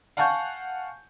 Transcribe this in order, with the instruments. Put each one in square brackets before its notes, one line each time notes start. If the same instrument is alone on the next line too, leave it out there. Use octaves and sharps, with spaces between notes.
[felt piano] F5 F#5 G#5 A5 C#6 G6